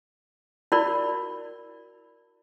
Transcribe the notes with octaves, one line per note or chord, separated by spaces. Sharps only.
E4 F#4 A#4 D5 B5